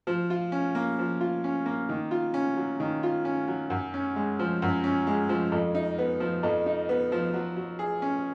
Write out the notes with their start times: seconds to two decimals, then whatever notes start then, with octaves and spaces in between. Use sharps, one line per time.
0.07 F3
0.30 F4
0.52 C#4
0.75 A#3
0.99 F3
1.20 F4
1.44 C#4
1.66 A#3
1.89 D#3
2.11 F4
2.34 C#4
2.57 F#3
2.80 D#3
3.03 F4
3.25 C#4
3.48 F#3
3.70 F#2
3.94 C#4
4.16 G#3
4.39 F3
4.62 F#2
4.84 C#4
5.07 G#3
5.29 F3
5.52 F2
5.75 D#4
5.98 B3
6.20 F3
6.43 F2
6.66 D#4
6.89 B3
7.12 F3
7.34 F#3
7.57 F#3
7.79 G#4
8.02 C#4